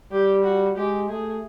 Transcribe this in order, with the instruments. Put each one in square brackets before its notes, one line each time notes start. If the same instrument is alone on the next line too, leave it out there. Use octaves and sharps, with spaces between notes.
[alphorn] G3 [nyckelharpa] G4
[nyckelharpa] F#4
[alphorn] G#3 [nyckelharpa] G4
[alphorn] A3 [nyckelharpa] G#4